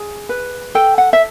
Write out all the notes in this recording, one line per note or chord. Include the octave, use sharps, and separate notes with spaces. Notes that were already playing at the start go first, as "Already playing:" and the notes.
Already playing: G#4
B4
A4 G5
F#5
E5